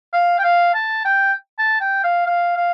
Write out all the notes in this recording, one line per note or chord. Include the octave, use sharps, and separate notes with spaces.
F5
G5
F5
A5
G5
A5
G5
F5
F5
F5